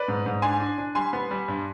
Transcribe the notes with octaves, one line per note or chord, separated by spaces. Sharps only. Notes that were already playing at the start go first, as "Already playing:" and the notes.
Already playing: B4 D5
G#2
G#2
D4 G#5 C6
D4
D4
G3 G#5 C6
B3
G3
G2